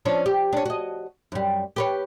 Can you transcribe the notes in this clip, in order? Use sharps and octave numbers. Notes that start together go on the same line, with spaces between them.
F3 C#4 D4
G4
C#4 D4
F#4 D#5
F#2 G3
G4 B4 C#5